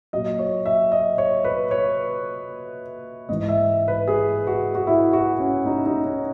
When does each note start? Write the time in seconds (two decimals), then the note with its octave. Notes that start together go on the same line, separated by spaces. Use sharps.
0.13 A#2 F#3 D#5
0.39 C#5
0.66 E5
0.92 D#5
1.18 C#5
1.44 B4
1.71 C#5
3.29 G#2 E3 D#5
3.48 E5
3.88 B4
4.08 G#4
4.47 F#4
4.75 F#4
4.87 E4
5.13 F#4
5.39 C#4
5.66 D#4
5.86 D#4
6.05 C#4